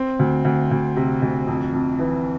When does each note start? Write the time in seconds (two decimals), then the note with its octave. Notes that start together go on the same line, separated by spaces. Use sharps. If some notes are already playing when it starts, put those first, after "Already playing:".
Already playing: C4
0.19 D2
0.45 D2
0.71 D2
0.96 C3
1.22 D2
1.47 F2
1.73 F2
1.99 E3